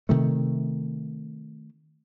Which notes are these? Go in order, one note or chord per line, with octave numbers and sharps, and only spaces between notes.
C3 D#3 A3